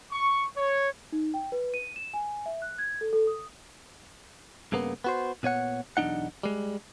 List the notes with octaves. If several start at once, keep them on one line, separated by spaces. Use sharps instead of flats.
C#6
C#5
D#4
G5
B4
D#7
E7
G#5
E5
F#6
G#6
A4
A4
D#6
G2 C#3 A#3 B3
B3 F#4 C5
A#2 B3 C#5 F#5
B1 E2 F3 D4 D#4 F#5
G3 G#3